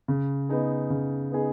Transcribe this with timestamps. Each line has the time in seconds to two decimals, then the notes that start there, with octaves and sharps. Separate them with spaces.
0.08 C#3
0.49 B3 D#4 G#4
0.90 C#3
1.32 B3 D#4 G#4